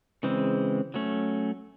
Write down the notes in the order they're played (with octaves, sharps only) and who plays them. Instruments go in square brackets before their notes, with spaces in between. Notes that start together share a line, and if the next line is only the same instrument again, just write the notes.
[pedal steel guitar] C#3 E3 G#3 C4
F#3 A3 C#4